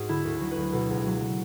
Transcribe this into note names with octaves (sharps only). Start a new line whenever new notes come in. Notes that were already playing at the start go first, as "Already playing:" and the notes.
Already playing: G#2 F#4 G#4
D3 E4
D2 A4
F#3
B4
D2
B2 A4
C#2
F#3